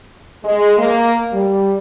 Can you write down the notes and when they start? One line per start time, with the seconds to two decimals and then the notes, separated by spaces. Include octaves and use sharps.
0.45 G#3
0.78 A#3
1.32 G3